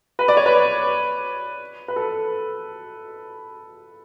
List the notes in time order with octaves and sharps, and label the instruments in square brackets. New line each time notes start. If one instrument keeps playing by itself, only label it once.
[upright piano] B4
D5
C#5
B4
B4
A4